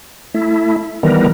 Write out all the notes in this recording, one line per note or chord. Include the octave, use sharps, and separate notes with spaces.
A3 E4
D#3 E3 G3 B3 A#4